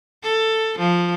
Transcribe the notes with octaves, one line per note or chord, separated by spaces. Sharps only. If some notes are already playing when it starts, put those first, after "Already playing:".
A4
F3